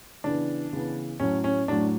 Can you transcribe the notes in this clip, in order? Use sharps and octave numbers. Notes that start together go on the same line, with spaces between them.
C#3 E3 B3 D4
C#3 E3 B3
A2 F#3 A3 C#4
C#4
A2 F#3 A3 D4